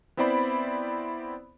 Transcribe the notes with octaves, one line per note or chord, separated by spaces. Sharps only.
B3 C4 E4 C5 D5 B5